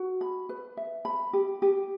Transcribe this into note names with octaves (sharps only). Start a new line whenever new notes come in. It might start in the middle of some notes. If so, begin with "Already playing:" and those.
Already playing: F#4
B5
B4
E5
B5
G4
G4